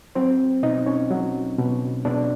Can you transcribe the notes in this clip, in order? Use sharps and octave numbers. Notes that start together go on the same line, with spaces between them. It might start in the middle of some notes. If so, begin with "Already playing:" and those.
F#3 C4 C5
B2 D#4 D#5
C#4 C#5
F#3
B2
B2 D4 D5